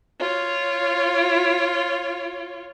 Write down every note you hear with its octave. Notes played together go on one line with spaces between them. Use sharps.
F4 C#5